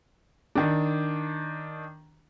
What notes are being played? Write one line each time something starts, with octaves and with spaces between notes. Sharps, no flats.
D#3 D4